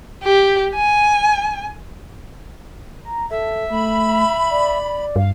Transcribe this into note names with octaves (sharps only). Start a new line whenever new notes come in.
G4
G#5
A#5
A4 E5
A3 B5
D5
G2 F5